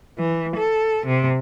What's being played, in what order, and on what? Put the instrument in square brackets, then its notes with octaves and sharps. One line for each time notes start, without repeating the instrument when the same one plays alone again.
[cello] E3
A4
C3